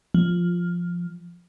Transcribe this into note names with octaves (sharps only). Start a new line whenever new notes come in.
F3